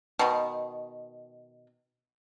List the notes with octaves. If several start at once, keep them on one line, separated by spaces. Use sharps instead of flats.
B2 D#3